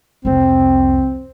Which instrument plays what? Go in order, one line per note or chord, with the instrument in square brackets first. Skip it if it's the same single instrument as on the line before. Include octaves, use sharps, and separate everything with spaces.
[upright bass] C2 F2 [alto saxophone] C4